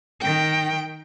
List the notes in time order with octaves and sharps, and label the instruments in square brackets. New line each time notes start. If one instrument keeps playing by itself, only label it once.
[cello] D#3 G5